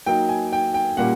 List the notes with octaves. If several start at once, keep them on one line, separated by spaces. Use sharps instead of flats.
F#3 A#3 D#4 G5
G#5
G5
G5
A#2 G3 A#3 C#4 F#5